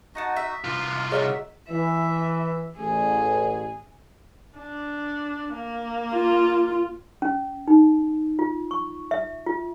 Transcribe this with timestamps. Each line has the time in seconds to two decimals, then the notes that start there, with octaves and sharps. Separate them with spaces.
0.15 D#4 F#4 D#5 F#5 A5
0.36 E5
0.64 C2 F4 A#5 C6
1.12 F#4 G#4 A#4 C#5 D#5 E5
1.68 E3 E5
2.76 A1 G#4
4.58 D4
5.54 A#3
6.13 F4
7.22 C#4
7.68 D#4
8.39 F4
8.71 C#6
9.11 E5
9.46 F4